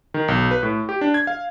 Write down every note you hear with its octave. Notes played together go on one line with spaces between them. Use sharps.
D#3
B1
B4
A2
G4
D4
G#6
F5